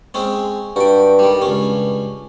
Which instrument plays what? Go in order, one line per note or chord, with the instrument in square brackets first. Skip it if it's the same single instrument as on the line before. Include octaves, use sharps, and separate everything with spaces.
[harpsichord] G#3 C4 C#4
[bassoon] G2 [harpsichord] F#4 G5
[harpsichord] D#3 G3
[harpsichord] C#2 C#4 [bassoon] G2